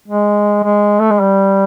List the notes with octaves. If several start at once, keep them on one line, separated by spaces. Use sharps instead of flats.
G#3
G#3
A3
G#3
G3